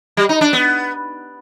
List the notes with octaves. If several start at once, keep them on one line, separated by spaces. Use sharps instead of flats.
G3
D#4
D4
B3